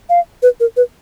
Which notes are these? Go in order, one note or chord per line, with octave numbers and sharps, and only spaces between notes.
F5
B4
A#4
B4